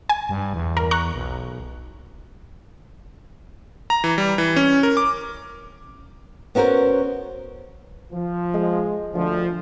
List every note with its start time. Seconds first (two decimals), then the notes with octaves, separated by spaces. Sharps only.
0.09 G#5
0.29 G2
0.54 E2
0.77 A#4
0.91 A#5 C#6 F#6
1.15 B1
3.90 A#5
4.04 E3
4.18 G3
4.38 E3
4.56 C#4
4.83 A#4
4.97 D6
6.55 B3 C#4 F#4 A#4 C5
8.12 F3
8.54 G#3
9.14 D2 F3